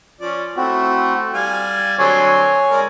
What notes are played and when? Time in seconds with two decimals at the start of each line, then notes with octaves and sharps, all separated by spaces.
0.21 F3 C#4 D5
0.57 A3 C4 E4 F#4
1.34 G3 F5 G#5
1.99 D3 F#3 C4 C#5 G#5
2.70 G#3 A#4 D5